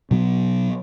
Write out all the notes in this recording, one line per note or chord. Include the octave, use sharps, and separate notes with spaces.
B2 F#3 B3